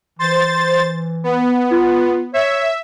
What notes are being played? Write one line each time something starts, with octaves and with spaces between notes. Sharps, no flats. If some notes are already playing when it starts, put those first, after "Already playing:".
E3 C5 A6
B3
F4
C#5 E5